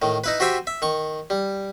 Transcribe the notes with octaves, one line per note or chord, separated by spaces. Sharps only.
A2 D#3
D#4 E4 B4
F#4 G4 C5 E5 G5 G#5
E5
D#3 C#6
G3